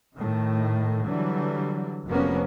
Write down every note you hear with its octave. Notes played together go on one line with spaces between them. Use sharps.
A2 D#3 A3
D3 E3 F#3 G3
F1 F3 F#3 A#3 B3 C#4